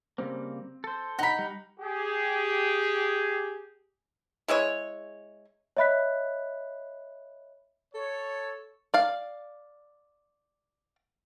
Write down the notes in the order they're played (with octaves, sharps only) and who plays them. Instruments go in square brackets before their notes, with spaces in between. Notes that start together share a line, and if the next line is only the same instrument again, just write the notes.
[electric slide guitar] C#3 G3 A#3 [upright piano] C4
[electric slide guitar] A4 C5
[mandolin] D#4 B5 [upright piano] F#5 A#5
[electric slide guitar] G3
[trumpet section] G4 G#4
[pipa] G#3 E4 G#4 C#5
[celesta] C#5 D#5 E5 B5 F#6 B6
[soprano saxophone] A4 [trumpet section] C#5
[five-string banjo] D5 F5